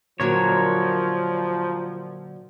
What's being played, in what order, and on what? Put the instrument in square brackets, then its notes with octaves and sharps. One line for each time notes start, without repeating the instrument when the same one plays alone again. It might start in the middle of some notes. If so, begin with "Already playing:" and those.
[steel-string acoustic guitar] A#2 D3 F#3 [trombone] F3 [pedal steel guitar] A#4 C#5